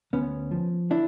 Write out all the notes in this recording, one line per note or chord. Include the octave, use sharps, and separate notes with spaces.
D2 B3 C#4
F3
D3 D4 E4